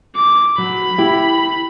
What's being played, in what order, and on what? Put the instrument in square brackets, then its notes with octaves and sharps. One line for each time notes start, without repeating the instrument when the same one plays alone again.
[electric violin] D6
[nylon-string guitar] F#3 [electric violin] B5
[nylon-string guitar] E4 G4